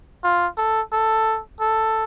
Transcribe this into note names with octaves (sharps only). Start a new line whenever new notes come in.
F4
A4
A4
A4